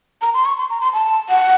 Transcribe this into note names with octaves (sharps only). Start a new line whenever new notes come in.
A#5
C6
C#6
C6
A#5
C6
A5
F#5